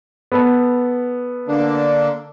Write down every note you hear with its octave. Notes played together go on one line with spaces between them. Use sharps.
B3 A4
D3 A#3 D4